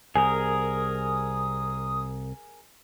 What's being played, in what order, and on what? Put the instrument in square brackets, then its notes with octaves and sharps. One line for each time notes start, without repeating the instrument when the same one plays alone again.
[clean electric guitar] C2 [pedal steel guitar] G#4 A#4 [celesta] G#5 [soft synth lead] D#6